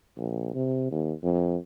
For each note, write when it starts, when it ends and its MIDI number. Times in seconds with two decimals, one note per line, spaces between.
0.17 0.50 34
0.54 0.87 48
0.91 1.12 39
1.23 1.56 41